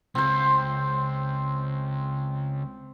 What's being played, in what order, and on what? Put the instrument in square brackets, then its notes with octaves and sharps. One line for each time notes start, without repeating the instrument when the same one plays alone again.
[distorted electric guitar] C#2 [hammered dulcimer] C4 C5